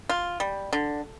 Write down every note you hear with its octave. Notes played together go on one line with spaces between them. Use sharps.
F4
G3
D3